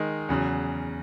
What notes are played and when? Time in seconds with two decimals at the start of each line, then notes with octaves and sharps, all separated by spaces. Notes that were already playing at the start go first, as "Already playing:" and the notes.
Already playing: D#3 G#3 D#4
0.29 E2 C#3 F#3